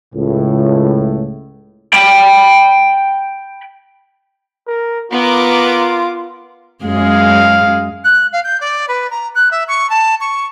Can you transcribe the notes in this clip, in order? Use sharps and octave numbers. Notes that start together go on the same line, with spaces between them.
C#2 A2
G5 B5
A#4
B3 F4 A#4 D6
F#2 G#3 G#4 F5
F#6
F5
G6
D5
B4
A#5
F#6
E5
C#6
A5
C#6